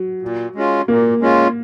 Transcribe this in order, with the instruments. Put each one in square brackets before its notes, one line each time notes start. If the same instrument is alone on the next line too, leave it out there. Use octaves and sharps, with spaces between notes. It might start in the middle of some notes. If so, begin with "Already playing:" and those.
Already playing: [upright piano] F#3
[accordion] A#2
G#3 C#4 F4
[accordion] A#2 [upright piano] A#3
[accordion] G#3 C#4 F4